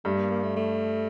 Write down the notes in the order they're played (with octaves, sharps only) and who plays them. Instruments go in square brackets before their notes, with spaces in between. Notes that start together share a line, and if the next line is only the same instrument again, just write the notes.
[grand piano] G2 G3 [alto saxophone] A3
[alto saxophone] A#3
A#3
A3
A3